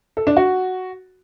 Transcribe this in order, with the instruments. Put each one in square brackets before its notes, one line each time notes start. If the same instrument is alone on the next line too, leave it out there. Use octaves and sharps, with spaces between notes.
[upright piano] A4
D4
F#4